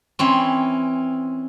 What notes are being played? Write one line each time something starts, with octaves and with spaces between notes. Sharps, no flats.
E3 C4 C#4